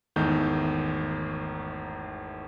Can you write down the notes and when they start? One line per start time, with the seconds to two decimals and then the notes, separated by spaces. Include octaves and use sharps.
0.16 G#1 E2 D#3 A3 D#4 G6